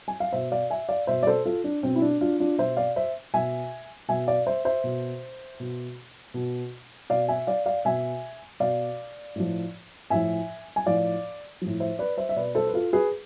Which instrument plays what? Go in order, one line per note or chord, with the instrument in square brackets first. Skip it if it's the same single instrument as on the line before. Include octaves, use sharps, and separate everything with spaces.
[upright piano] G#5
F5
B2 C5 E5
D5 F5
E5 G#5
D5 F5
B2 C5 E5
D5
A4 C5
F4 A4
D4
B2 C4
E4
D4
D4 F4
D4 F4
B2 C5 E5
D5 F5
C5 E5
B2 E5 G#5
B2 E5 G#5
D5 F5
C5 E5
C5 E5
B2
B2
B2
B2 D5 F5
E5 G#5
D5 F5
D5 F5
B2 E5 G#5
B2 D5 F5
A2 F3
A2 F3 E5 G#5
G#5
A2 F3 D5 F5
A2 F3
C5 E5
B4 D5
C5 E5
E5
B2 B4 D5
A4 C5
B4
F4 A4
G#4 B4